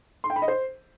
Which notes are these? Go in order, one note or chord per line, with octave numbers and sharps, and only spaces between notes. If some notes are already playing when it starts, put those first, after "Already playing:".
C6
G5
B5
D#5
C5